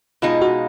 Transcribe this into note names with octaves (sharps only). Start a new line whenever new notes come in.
B2 G#3 D#4 F4
F#4